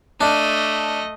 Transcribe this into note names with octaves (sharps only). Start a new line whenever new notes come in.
A3 D4 D#5